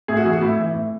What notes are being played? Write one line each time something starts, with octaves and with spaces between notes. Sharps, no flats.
A2 G#4
F#4
E3 G#4
F#4
A2 E4
E3
A2